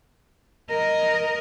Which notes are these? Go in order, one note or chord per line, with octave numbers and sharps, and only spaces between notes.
A#4 D#5